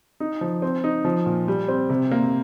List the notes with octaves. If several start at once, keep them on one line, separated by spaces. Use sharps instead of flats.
D#4
F3
C4
D#4
F3
A#2
G3
C4
C3
A#3